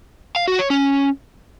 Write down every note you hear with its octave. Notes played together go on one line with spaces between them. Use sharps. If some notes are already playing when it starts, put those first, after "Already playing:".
F5
F#4
C#5
C#4